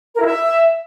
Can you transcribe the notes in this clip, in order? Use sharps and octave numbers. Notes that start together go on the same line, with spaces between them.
A#4
E4
E5